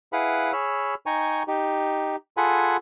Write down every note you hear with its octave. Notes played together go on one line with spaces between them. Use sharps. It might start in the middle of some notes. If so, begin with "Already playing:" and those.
E4 G#4 B4 F5 F#5 B5
G#4 C#5 B5 E6 F6
D#4 G5 G#5 A#5 C#6
D#4 G4
F4 G#4 A4 F#5 G#5 B5